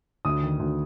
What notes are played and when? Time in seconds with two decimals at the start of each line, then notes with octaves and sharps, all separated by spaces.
0.25 D2 D#6
0.42 D#3
0.60 D2